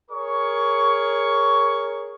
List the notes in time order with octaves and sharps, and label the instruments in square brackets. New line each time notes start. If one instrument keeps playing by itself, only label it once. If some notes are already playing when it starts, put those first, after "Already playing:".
[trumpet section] G#4 A#4 C#5 C#6